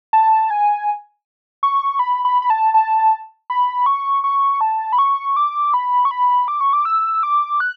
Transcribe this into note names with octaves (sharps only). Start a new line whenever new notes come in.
A5
G#5
C#6
B5
B5
B5
A5
A5
B5
C#6
C#6
A5
B5
C#6
D6
B5
C#6
B5
D6
C#6
D6
E6
D6
F#6